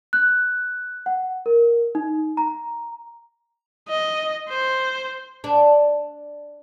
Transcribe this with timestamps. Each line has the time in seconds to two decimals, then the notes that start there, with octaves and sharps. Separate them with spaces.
0.13 F#6
1.06 F#5
1.46 A#4
1.95 D#4
2.37 A#5
3.89 D#5
4.49 C5
5.44 D4